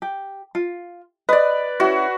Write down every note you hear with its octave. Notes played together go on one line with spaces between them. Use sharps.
G4
F4
B4 D5 D#5
C#4 E4 F#4